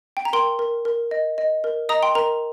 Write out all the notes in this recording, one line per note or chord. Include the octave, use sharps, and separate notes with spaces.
G5
A#5
A#4 G5 C6
A#4
A#4
D#5
D#5
A#4
D#5 A#5 D#6
G5 C6
A#4 A#5